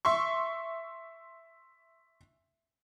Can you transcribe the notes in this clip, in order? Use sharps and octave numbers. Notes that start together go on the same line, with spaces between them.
E5 C6 C#6